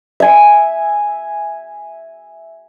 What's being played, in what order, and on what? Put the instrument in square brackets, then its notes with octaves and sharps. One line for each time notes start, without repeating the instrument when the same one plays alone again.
[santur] E5 G#5